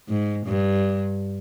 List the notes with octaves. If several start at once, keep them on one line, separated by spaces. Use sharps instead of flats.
G#2
G2